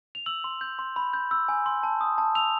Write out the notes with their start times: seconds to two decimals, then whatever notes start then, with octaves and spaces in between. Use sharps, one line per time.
0.15 F7
0.26 E6 F#7
0.44 C6
0.61 G6
0.79 C6
0.96 B5
1.13 G6
1.31 E6
1.49 G#5
1.66 C6
1.83 A5
2.01 D#6
2.18 A5
2.35 E6 F7